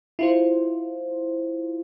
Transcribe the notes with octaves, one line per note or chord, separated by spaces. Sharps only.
E4 F4 C5